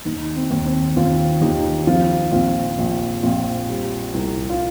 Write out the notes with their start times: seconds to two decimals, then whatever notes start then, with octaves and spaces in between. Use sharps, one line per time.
0.05 D#2 D#4
0.36 C4
0.51 D#2
0.66 C4
0.96 D#2 C4 F4
1.41 D#2 D#4 G4
1.87 F3 C4 F4
2.32 A#1 C4 F4
2.79 A#1
3.23 A#1 C4 F4
3.69 G3
4.14 C2
4.50 F4